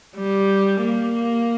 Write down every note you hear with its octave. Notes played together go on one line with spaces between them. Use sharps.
G3
A#3